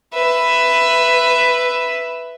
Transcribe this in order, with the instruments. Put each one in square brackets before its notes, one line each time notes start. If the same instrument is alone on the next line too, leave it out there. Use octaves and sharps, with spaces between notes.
[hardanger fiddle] B4 E5